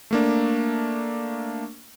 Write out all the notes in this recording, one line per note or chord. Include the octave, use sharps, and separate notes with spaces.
A3 A#3 D4